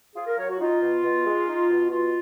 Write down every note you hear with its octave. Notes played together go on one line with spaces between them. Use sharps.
F4 G#4
A#4
F#3 C#5
F#4
D#4 F4
B2
B2
G#3
D#4
B2
B2 F4